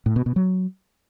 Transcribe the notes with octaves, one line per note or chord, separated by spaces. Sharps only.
A2
B2
B2
F#3